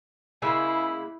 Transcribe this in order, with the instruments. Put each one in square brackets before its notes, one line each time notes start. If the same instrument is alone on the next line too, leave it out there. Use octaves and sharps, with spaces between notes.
[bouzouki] C#3 G#3 A#3 [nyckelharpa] E4 [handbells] G#5 E6